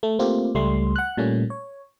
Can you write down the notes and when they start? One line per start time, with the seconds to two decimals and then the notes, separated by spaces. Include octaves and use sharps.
0.03 A3
0.19 A3 A#3 C4 F4 G4
0.55 C#2 G3 A3 C6
0.96 F#5 F#6
1.17 A#2 G3 A3 A#3 C#4
1.50 C#5